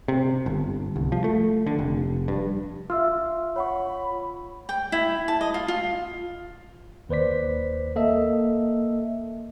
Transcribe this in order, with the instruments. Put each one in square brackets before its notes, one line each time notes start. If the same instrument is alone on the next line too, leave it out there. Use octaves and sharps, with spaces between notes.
[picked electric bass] C3
G1
C2
F3
A3
D3
F1
G2
[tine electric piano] F4 [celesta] E5 E6 F6
[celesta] C#5 F#5 C#6 [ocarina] B5
[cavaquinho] G5
E4
A5
D#5
F4
F4
[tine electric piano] D#2 B4 C5 D5 B6
A#3 A4 D#5 E5